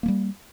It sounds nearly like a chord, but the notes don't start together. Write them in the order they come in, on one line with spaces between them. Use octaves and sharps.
A#3 A3 G3